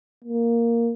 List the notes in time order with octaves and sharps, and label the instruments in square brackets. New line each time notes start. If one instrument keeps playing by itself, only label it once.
[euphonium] A#3